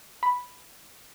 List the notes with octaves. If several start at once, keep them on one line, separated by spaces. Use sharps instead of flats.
B5